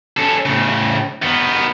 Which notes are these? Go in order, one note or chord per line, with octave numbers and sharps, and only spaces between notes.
C#4 A4
A2 C#3
D#3 B3